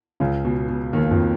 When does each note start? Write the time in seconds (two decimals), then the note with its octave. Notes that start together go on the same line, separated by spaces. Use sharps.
0.20 C#2 C#3
0.45 B2
0.69 B2
0.93 D#2 D#3
1.11 F2 F3